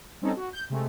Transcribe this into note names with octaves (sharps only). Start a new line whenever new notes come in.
G3 C4 C#4 D#4 A4
F#4
G6
C3 G#3 A3